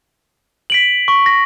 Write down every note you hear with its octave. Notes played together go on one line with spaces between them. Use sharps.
B6 D7 F#7
C#6
A#6